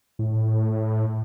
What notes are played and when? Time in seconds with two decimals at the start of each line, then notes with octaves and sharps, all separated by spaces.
0.19 A2